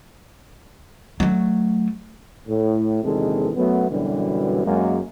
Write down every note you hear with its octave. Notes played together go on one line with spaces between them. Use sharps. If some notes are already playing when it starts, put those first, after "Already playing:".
F#3 A3
A2
A#1 E2 C3 D#3 G#3 A4
F#2 F#3 A3 B3
F#2 B2 D3 E3 G3
F#2 G#3 A#3